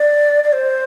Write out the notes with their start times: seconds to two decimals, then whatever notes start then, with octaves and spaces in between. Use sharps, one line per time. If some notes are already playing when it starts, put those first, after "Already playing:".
Already playing: D5
0.44 D5
0.53 C5